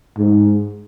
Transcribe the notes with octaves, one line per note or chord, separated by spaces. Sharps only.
G#2